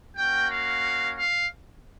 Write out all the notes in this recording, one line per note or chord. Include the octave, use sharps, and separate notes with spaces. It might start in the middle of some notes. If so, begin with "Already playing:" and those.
A#3 C#4 F#4 G5
F5
F5